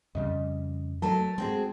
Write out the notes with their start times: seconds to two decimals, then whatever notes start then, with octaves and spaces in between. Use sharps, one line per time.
0.15 F2 C#3 G3 D#5
1.02 F#3 A3 A4 A#4 A5
1.38 G#3 C4 F#4 G#4